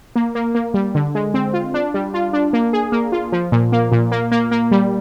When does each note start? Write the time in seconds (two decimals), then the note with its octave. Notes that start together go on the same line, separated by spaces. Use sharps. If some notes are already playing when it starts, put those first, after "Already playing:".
0.16 A#3
0.35 A#3
0.55 A#3
0.74 G3
0.95 D3
1.15 G#3
1.34 C4
1.54 F4
1.74 D4
1.94 G3
2.14 F4
2.33 D4
2.53 A#3
2.73 G#4
2.92 A#3
3.12 F4
3.32 F3
3.52 A#2
3.72 A#3
3.92 A#2
4.12 A#3
4.32 A#3
4.51 A#3
4.71 G3